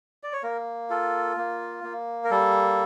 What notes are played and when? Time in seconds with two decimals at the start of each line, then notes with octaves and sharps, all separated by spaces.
0.23 D5
0.33 C#5
0.43 A#3 A#4
0.90 F4 A4
1.37 A#3
1.84 A#3
2.25 A#4
2.31 G3 A4